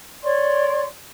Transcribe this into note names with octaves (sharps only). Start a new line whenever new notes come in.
C#5 D5 C6 C#6